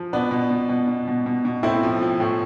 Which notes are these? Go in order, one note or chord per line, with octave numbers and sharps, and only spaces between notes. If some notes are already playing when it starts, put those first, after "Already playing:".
Already playing: F3
B2 B3 D4
B2
B2
B2
B2
B2
B2
B2
A2 C4 E4
F3
F3
A2